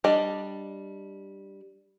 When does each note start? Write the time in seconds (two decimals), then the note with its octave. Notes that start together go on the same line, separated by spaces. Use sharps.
0.04 G3 D4 D5 D#5